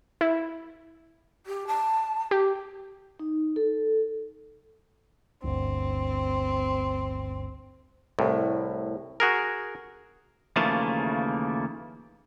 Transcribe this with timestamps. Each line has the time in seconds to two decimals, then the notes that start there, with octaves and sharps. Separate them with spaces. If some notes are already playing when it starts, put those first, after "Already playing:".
0.21 E4
1.46 G4
1.67 A5
2.31 G4
3.20 D#4
3.56 A4
5.44 G1 D2 C4
8.19 C2 A2
9.20 F#4 G#4 A#4
10.56 D#2 C#3 E3 F3 A3 A#3